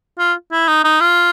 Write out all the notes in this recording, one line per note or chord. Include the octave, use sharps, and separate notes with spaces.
F4
E4
D#4
D#4
F4